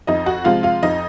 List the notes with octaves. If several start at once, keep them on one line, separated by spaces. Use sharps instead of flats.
F2 D#4 D#5
F#4 F#5
C3 F3 G#3 F4 F5
F4 F5
F2 D#4 D#5